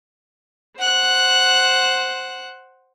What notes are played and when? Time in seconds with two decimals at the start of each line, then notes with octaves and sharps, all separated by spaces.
0.78 C5 F#5 F#6